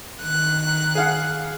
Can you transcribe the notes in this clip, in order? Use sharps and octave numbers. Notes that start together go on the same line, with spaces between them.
D#3 F#6
G#4 F5 F#5